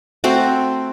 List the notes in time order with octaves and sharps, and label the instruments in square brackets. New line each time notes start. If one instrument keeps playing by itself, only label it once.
[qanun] A3 C4 F#4 C5